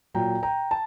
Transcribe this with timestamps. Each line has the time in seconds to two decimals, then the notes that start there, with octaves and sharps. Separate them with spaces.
0.14 A#2 F#3 G5 A#5
0.43 G5 A#5
0.71 A5